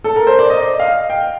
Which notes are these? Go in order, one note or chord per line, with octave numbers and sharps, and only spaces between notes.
A4
A#4
C5
D5
D#5
F5
G5